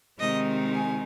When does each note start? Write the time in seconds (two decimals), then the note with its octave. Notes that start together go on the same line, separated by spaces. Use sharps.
0.19 C3 D#3 G#3 C4 D#4 D#5
0.74 G#5